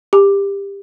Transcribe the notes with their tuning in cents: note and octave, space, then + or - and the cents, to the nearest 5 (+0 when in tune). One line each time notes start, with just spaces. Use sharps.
G4 +20